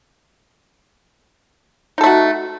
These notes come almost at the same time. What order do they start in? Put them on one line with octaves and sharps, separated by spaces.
D#4 A4 A3 F#4